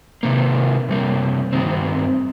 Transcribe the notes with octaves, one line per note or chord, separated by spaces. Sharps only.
C3 D#3 A#3
C3 G3 A#3
G2 D#3 C4